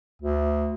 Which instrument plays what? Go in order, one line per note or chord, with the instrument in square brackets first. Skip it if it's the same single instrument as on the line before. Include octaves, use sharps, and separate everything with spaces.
[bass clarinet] D2